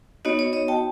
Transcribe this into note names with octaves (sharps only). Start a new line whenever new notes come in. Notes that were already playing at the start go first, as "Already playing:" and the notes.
B3 D#4 F#4 C#5 D#5
C#5 D#5
C#5 D#5
G5 A5